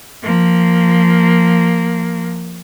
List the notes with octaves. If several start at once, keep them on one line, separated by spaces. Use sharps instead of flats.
F3 A#3